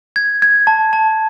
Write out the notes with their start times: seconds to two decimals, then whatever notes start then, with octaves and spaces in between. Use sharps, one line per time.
0.16 G#6
0.42 G#6
0.67 A5
0.93 A5